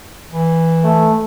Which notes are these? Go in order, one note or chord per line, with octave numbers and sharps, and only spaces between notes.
E3
A3